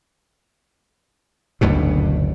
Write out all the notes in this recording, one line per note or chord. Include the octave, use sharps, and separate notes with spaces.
F#1 D2 G2 B2